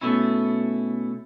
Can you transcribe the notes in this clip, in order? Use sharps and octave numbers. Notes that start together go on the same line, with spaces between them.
B2 A3 C#4 E4